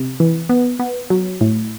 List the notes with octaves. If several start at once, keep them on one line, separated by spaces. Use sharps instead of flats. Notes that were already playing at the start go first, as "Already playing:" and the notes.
Already playing: C3
E3
B3
B3
F#3
A2